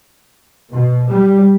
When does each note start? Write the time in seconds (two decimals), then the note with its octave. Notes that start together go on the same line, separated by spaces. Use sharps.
0.70 B2
1.09 G3